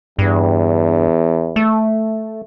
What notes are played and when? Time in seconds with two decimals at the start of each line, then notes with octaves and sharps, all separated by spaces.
0.19 E2 G2
1.56 A3